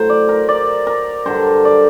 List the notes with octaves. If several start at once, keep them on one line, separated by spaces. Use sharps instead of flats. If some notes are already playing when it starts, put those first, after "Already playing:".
Already playing: A2 F#3 C5
D5
A#4
D5
A#4
G2 D3 F#3 C5
D5